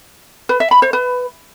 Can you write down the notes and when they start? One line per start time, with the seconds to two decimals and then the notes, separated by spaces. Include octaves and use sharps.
0.49 B4
0.60 E5
0.71 B5
0.82 C5
0.93 B4